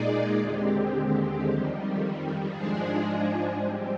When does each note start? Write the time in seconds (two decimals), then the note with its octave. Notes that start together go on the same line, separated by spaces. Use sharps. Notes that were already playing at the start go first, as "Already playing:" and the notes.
Already playing: A#2 G#3 D#4 G#4 D5
0.40 D#2 D3 G#3 C4 G4
1.46 F2 D#3 G3
2.50 G#2 F3 G#3 D4 G#4
3.56 G#2 G3 C4 G4